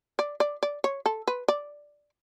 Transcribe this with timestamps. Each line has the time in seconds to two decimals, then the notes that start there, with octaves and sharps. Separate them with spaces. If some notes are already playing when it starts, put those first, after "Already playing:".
0.19 D5
0.40 D5
0.63 D5
0.84 C#5
1.06 A4
1.28 B4
1.48 D5